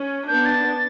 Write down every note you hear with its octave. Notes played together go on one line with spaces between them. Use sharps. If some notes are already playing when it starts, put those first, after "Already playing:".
Already playing: C#4
B3 D4 G6
A6